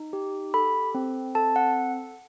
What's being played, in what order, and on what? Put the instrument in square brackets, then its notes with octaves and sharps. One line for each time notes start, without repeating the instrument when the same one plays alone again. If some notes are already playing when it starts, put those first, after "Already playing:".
Already playing: [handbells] D#4
G4
A4 B5
C4
A4 A5
F#5